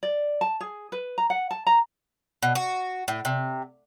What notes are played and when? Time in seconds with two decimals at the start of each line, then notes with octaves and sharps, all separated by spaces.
0.03 D5
0.41 A5
0.61 G#4
0.92 B4
1.18 A#5
1.30 F#5
1.51 A5
1.67 A#5
2.43 B2
2.55 F#4
3.08 A2
3.25 C3